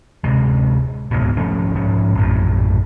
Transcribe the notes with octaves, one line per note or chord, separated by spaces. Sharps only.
D1 C3 G#3
D#1 C#2 G#2 B2
G#1 F3 A3 C#4
B1 G#2 F3 C#4
A#1 F#2 A2